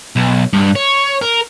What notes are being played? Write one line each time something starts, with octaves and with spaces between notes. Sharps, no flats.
B1
G2
C#5
A#4